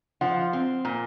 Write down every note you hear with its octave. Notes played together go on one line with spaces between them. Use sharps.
F3 F#5
C4
A#2